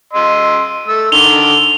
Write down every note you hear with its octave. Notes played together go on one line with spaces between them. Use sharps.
D#5 C6 E6
A3 E6
D3 D#3 F7 G7